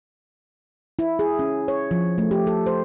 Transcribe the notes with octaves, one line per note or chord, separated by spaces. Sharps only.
E4
G#4
C#4
C#5
F3
A3
G4
A4
C5